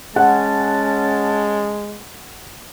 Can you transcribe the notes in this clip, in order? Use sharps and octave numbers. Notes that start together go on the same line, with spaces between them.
G#3 C#4 F#5 A5